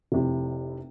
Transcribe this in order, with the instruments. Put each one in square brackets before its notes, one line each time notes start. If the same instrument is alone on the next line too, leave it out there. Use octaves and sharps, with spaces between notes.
[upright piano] F1 C3 E4